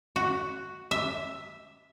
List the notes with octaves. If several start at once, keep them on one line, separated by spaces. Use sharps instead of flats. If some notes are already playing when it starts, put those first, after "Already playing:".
F#4
E5